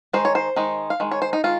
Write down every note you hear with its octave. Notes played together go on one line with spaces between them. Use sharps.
D#3 G#3 D#4 C5
C#5
C5
D#3 G#3 D#4
F5
D#3 G#3
C#5
C5
D#4
D#3 G#3 F4